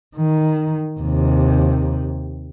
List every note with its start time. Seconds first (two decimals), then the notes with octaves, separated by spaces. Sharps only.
0.16 D#3
1.00 D#2 C3